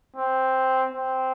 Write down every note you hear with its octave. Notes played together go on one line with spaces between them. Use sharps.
C4
C4